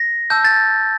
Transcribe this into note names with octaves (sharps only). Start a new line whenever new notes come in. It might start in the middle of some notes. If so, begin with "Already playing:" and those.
Already playing: A#6
A5 E6 G6
A6